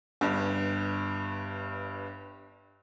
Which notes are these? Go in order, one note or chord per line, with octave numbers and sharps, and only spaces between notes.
G1 G2